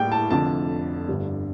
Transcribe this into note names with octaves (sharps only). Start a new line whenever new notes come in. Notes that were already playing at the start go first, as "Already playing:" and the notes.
Already playing: A2 G3 A#3 G5
A5
F1 F2 D3 A5
G1 G2 D3 G3